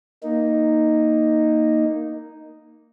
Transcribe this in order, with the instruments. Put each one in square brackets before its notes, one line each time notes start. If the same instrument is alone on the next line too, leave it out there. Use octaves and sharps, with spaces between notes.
[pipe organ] A#3 D#4